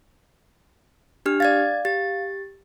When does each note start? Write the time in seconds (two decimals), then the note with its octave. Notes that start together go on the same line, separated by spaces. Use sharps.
1.26 D4 G4 F6
1.40 D5 F5 G#6 A6
1.85 G4 A6